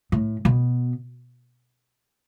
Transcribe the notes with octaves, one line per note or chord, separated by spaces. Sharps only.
A2
B2